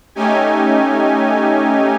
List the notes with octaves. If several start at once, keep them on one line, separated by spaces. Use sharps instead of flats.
A3 C#4 D#4 G4 G#5